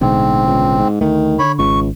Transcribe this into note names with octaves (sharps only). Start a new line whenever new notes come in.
A1 G#2 B2 D3 C4
C#2
G#2
D2 D#3 A3
D3 C#5 B5
G#1 C#2 C#6